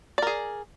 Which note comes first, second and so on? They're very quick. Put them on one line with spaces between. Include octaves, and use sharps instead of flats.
D5 A#4 G#4